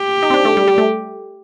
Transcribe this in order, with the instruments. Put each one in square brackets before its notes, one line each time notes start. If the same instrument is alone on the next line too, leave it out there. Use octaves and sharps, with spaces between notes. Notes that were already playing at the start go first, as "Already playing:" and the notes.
Already playing: [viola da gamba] G4
[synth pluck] D#4
C4
D4
A3
G3
G3
A3